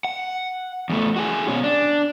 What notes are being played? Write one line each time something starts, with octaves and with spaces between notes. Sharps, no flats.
F#5
E2 A3
F#4 G#4
B2 C#4
D4